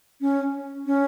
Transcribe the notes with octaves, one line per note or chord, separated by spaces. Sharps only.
C#4
C#4